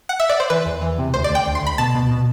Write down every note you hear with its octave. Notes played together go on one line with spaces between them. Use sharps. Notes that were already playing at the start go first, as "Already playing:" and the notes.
F#5
E5
D5
C5
E3 B4
E2
E3
C3
D2 C5
D5
D2 G5
D2
C6
D2 B5
B2 A5
B2
B2